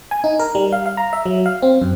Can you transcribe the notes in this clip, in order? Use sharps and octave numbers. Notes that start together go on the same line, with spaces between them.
G#5
D#4
A#4
G3
F5
F5
A#5
E5
F#3
F5
C4
F#2